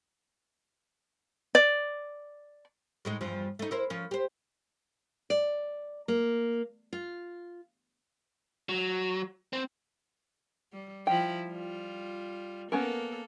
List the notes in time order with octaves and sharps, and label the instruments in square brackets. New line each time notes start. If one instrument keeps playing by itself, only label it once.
[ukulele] D5
[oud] A2 G#3 D#4
E2 G2 F3
A3 D#4
E4 A#4 C5
F3 C#4
G4 C5
[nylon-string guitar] D5
A#3
F4
[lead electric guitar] F#3
C4
[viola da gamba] G3
[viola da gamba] F3 E4 [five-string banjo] G5
[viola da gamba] G3 F4
[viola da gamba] A#3 A4 [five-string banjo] B3 C#4 A#4